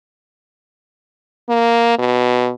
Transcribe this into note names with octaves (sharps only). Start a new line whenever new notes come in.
A#3
B2